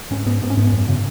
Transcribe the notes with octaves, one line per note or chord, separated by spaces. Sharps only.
G#2 C#4
G#2 B3
G#2 B3
C#4
G#2 B3
F#2
C#3